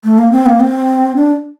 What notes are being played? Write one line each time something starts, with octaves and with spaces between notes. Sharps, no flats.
A3
A#3
C4
A#3
C4
D4